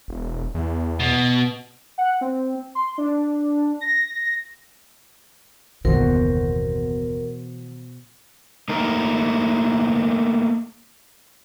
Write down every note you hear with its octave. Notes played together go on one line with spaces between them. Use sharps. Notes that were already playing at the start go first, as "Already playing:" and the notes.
E1
E2
B2
F#5
C4
C6
D4
A#6
F#1 D#2 B2 E3 F#4 A#4 C5
A3 A#3 D#4 A#4